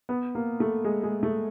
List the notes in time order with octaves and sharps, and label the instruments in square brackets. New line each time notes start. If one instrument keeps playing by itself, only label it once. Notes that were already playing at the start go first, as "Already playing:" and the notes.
[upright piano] B3
A#3
A3
G#3
G#3
A3